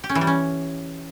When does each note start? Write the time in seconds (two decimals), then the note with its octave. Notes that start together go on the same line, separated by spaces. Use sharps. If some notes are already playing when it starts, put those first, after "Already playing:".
0.04 G4
0.09 C#4
0.15 E3
0.21 G3
0.27 C#4